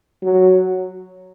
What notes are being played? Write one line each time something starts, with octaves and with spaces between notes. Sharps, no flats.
F#3